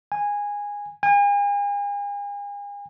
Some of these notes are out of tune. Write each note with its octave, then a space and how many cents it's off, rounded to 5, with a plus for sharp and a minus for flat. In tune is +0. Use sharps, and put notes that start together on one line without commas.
G#5 -15
G#5 -40